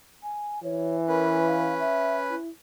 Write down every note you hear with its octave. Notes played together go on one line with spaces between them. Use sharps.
G#5
E3 C#5
C#4 A#4 B4
F5
E5
E4